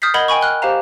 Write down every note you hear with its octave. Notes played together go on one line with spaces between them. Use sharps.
D#6 F6 G6 A6 B6 C7
A#4 D#5 F#5 B5 G#6 G7
G5 G#5 B5 C#6
F6 F#6 G7
G4 C5 F5 A#5